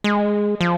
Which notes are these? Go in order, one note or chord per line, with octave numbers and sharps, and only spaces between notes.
G#3
F3